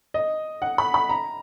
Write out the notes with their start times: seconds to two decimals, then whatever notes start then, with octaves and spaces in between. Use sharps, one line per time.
0.14 D#5
0.62 F#5
0.78 B5
0.94 B5
1.09 A#5